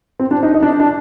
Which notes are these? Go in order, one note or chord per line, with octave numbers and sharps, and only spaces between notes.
C4
D4
D#4
D#4
D4
D4